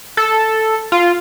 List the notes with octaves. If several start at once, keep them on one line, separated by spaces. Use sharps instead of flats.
A4
F4